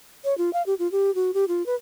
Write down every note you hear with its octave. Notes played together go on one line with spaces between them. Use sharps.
C#5
F4
F5
G4
F4
G4
F#4
G4
F4
B4